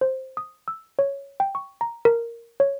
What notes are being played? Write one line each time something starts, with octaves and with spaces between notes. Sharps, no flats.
C5
D#6
E6
C#5
G5
C#6
A#5
A#4
C#5